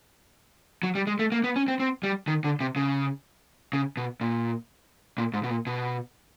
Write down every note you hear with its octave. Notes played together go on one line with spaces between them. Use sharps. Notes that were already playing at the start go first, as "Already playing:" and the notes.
F#3
G3
G#3
A3
A#3
B3
C#4
C4
C4
G3
D#3
D3
C3
C#3
C#3
B2
A#2
A#2
G#2
B2
A#2
B2